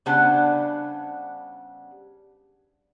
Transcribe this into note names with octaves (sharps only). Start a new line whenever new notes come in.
C#3 G3 B3 D4 C5 F#5